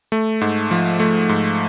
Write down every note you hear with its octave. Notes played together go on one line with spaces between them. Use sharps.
A3
G#2
F3
A3
G#2